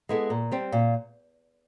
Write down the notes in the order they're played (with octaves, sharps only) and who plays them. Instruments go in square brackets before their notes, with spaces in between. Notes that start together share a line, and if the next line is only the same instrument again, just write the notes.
[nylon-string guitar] G#3 B3 E4 A4
A#2
G3 C4
A#2